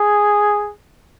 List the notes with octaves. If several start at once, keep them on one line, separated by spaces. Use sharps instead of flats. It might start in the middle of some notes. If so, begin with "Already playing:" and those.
Already playing: G#4